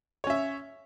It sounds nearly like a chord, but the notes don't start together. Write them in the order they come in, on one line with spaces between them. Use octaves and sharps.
C#5 C#4 E5